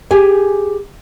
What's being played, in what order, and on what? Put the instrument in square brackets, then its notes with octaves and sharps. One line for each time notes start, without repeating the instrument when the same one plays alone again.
[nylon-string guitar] G4 G#4 G#5